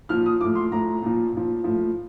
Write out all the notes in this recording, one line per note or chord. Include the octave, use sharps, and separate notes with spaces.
A#2 F3 F6
D#6
A2 F3 D6
C6
A2 F3 A#5
A#2 F3
A#2 F3
A2 F3